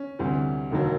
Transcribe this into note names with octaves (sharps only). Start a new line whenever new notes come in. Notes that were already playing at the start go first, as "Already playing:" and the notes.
Already playing: C#4
D2 C3 E3 G3
E1 D#2 D#3 F#3